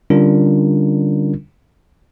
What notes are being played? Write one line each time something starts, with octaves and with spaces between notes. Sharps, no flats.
D3 G3 C#4 D4 F4 A#4